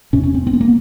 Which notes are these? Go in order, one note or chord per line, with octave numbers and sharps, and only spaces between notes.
E2 C3 C#4
C#4
C4
C4
B3
A#3